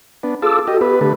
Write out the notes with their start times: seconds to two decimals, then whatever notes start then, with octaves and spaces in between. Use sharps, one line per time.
0.23 B3 D4
0.42 F4 G#4 A4 D6 E6
0.68 F#4 G4 A4 D#5
0.81 B3 G4 B4
1.01 D3 A3 B4